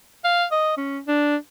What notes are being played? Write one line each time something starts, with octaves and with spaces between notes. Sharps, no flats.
F5
D#5
C#4
D4